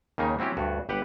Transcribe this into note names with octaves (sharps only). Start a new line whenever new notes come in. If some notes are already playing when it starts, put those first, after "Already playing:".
D#2 C#3 A#3 D#4
F#3 C4 C#4 E4 G4
D2 G2 F#4
G1 G4 B4 F#5